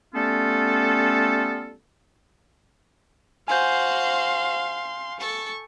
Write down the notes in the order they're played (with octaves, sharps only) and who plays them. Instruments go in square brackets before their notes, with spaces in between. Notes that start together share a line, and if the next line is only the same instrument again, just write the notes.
[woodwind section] G3 A3 B3 C#4 F4 A4
[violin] F#4 C5 [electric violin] F5 C6 [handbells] G#5 G6
[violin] A4 [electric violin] C#6